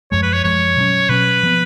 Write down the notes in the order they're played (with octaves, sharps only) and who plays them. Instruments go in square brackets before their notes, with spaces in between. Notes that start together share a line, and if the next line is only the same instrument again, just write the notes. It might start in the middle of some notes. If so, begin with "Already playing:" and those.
[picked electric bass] F#2 F3 G#3 [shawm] C#5
[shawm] B4
C#5
[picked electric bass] F#2 F3 G#3 [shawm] C#5
[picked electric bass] B2 F#3 C#4
[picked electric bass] B2 F#3 C#4 [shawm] B4
[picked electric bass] F3 B3